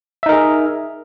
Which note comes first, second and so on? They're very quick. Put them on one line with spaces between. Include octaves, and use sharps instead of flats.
E5 D#4 A#4 G#4